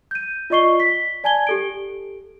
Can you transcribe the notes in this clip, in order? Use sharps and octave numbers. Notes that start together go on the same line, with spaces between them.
G6 D#7
F4 D5 D#5 C#6 C7 G7
B6
D5 G#5 A5 G#6 G7
G4 A4 D7